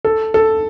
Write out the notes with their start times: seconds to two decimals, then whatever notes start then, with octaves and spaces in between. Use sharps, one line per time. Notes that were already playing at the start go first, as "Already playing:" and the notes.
0.05 A4
0.34 A4